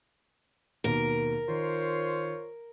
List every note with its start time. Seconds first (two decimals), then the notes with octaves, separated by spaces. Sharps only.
0.84 D#2 B2 A#3 A#4
1.48 D#3 F4 C5 C#5